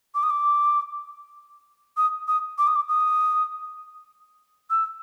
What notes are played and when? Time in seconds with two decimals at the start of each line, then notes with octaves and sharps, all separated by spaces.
0.15 D6
0.23 D#6
0.30 D6
1.97 D#6
2.28 D#6
2.58 D6
2.67 D#6
2.76 D6
2.89 D#6
4.70 E6